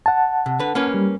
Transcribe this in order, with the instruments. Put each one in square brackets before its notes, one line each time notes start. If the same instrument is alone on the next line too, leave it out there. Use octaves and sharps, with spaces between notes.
[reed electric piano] F#5 A5
[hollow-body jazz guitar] C3
D3 B4
A#3 C#4 B4
[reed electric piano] G3